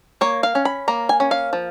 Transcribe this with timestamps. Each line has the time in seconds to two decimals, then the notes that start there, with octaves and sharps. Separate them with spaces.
0.21 A#3 C#5
0.43 F5
0.55 C#4
0.65 B5
0.88 A#3 A#5
1.09 G#5
1.20 C#4
1.31 F5
1.53 F3